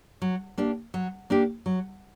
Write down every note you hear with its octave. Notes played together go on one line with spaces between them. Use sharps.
F#3
A#3 D4 G4
F#3
A#3 D4 G4
F#3